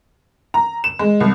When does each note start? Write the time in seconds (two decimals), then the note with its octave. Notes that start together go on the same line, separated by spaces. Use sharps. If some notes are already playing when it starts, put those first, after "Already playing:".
0.54 A#5
0.84 E7
0.99 G#3
1.20 C2